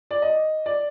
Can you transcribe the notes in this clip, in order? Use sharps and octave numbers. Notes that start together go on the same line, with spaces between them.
D5
D#5
D5